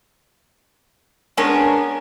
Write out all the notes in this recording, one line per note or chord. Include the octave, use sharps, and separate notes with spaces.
G#3 B3 C#4 D4 A#4